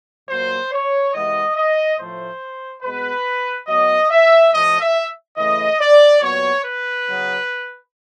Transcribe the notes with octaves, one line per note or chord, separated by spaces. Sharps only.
A#2 F#3 A#3 C5
C#5
C3 E3 G#3 B3 D#5
D#5
A2 F3 A3 C5
B2 G#3 B3 B4
A2 F#3 B3 D#5
E5
A2 F3 A3 D#5
E5
C#3 E3 A3 D#5
D5
A#2 F#3 B3 C#5
B4
C#3 F#3 B3